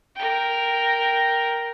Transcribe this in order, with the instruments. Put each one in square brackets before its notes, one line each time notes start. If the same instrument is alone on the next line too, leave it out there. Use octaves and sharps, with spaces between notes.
[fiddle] A#4 G5